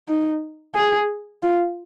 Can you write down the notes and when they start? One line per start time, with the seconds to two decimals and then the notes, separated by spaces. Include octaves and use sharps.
0.08 D#4
0.75 G#4
1.43 F4